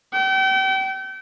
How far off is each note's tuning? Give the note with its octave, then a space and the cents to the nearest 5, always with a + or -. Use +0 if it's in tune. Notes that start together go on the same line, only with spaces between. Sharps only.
G5 -35